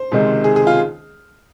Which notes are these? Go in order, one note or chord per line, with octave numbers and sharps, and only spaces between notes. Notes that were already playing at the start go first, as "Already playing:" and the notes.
Already playing: C5
C#2 C3 D#3 G#3
G#4
G#4
F4